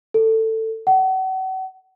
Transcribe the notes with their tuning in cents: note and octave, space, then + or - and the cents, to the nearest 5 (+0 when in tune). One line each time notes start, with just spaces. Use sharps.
A4 +15
F#5 +35